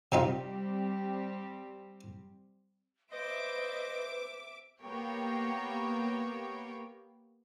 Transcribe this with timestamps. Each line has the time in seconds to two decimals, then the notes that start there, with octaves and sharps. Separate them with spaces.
0.12 C3 G3 C4 D#4 F4 G4
3.12 B4 C5 D#5 E5 D6 D7
4.82 A#3 B3 G4 C#5 G5